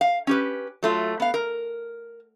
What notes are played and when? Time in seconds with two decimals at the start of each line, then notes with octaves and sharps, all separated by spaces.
0.01 F5
0.27 C#4 G4 B4
0.83 F#3 A3 F4
1.20 B3 F5
1.34 A#4